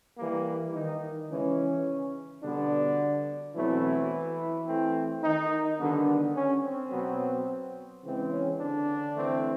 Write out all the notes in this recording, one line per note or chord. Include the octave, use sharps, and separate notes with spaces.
E3 G3 A#3
D#3 D#4
C#3 E3 G#3 C#4
B2 D3 G3 B3 D4
B2 E3 F#3 A3 C4 E4
E3 A3 C4
D#3 D#4
D3 D#3 G3 B3 D4
C#4
C4
B2 F#3 B3
C#3 E3 G#3 C4
C#4
D3 D4
E3 A3 C4